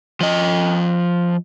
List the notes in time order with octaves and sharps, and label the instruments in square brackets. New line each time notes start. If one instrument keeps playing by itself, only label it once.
[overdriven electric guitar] F3 D#5